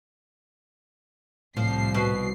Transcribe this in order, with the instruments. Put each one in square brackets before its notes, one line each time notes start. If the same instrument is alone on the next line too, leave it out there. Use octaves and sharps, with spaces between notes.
[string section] C2 C7 [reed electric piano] A2 [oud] F3
[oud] B2